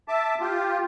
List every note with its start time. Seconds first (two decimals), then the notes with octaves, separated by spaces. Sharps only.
0.08 E5 A5 D6
0.40 F4 G4